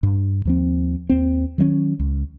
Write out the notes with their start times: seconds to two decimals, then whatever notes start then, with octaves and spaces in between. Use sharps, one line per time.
0.03 G2
0.45 D#2 F3 C4
1.09 D#2 C4
1.58 D#3 F#3 G#3 C#4
1.99 C#2